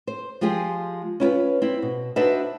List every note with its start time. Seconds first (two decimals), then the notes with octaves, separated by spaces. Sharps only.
0.07 C5
0.41 F3 G#3 F4 G4 G#4
1.20 C#4 E4 F4 B4
1.62 C4 E4
1.82 B2
2.16 D4 D#4 F#4 B4 C5 E5